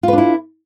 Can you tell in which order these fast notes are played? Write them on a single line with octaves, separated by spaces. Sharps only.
F4 B4 D4 E4